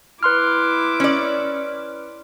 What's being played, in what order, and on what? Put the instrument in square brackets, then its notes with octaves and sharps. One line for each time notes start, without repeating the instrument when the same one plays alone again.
[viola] E4 D6 [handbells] B4 C6 F6
[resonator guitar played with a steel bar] C#4 D5